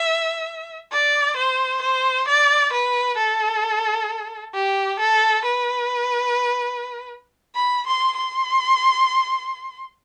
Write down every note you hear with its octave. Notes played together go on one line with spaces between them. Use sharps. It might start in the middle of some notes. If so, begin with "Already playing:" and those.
Already playing: E5
D5
C5
C5
D5
B4
A4
G4
A4
B4
B5
C6
C6